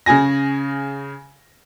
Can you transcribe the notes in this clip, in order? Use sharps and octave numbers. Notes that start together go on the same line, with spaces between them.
C#3 G#4 G#5 A#6